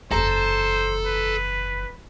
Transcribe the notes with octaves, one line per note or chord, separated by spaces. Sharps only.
F#1 E2 A4 C5 A#5
B4